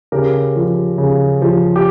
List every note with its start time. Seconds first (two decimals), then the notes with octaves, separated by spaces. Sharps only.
0.12 C#3 G4 A#4
0.56 F3
0.98 C#3
1.42 F3
1.76 G4